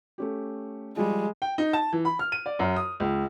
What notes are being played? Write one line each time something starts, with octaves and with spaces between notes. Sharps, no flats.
A3 C#4 G4
F3 G3 G#3
G5
D#4
A5
E3
B5
F6
D#7
D5
F#2
D#6
C#2